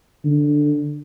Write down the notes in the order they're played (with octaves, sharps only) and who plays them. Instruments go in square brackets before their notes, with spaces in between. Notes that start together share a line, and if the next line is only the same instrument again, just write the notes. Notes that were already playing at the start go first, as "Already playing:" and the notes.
[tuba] D3